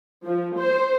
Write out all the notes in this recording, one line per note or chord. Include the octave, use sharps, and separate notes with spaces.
F3
C5